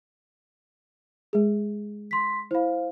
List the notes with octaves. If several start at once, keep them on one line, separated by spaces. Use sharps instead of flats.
G#3 G#4
C6 B6
E4 C5 F5 B5